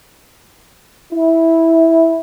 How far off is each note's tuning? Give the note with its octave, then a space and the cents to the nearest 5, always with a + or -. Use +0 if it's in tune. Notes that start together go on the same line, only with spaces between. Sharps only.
E4 -10